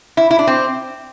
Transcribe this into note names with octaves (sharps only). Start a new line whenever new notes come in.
E4
E4
D4
C4